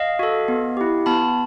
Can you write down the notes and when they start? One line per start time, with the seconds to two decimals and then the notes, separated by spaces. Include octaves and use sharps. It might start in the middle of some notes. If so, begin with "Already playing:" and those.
Already playing: D#5 F5
0.19 F#4 A4
0.48 B3
0.77 E4 G4
1.06 B3 A5 B5